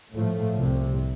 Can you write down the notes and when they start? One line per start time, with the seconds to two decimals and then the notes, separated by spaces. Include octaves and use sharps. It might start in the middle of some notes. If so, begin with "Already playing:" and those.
0.12 A2 F3 A3
0.57 C2 C3